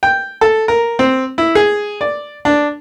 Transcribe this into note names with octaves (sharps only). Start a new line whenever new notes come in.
G5
A4
A#4
C4
E4
G#4
D5
D4